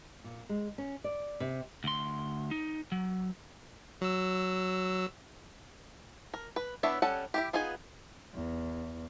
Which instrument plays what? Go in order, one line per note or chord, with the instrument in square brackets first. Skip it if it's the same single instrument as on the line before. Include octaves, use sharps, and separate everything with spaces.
[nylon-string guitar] A#2
G#3
C#4
D5
C3
[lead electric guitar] D2 C6
D#4
F#3
[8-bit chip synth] F#3 E6
[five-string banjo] A#4
B4
B3 D4 E4 C#5 E5
G3 C#4 A4 F#5 A5
E4 F4 G4
B3 D#4 F4 G#4 G#5
[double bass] E2